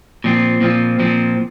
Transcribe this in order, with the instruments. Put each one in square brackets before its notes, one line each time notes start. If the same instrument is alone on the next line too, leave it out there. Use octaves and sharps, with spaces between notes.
[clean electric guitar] A#2 F3 C4
A#2 F3 C4
A#2 F3 C4